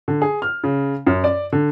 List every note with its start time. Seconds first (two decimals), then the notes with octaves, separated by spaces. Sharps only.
0.08 D3
0.22 G#4
0.42 F6
0.64 C#3
1.07 F#2
1.24 D5
1.52 D3